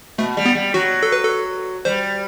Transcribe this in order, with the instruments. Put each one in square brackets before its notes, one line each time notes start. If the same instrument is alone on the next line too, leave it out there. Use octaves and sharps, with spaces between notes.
[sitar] B2 [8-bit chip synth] A3
[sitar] G3
[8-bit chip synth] B3
[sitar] G3
[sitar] F#3 [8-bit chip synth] F#4
[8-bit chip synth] A4
B4
A4
[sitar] G3 [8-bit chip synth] C5